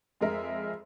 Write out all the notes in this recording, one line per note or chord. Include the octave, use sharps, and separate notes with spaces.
F2 G#3 A#4 E5